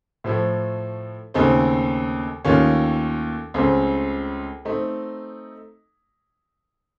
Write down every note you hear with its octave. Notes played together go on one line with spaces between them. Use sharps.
A2 F3 A3
D#2 C#3 A3 C4 D#4
D#2 D#3 A3 C#4 F4
C#2 C#3 A3 C4
A3 C4 D#4